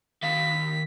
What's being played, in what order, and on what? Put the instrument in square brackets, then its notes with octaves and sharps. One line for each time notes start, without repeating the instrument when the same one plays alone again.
[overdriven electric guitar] D#3 F5 [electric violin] B6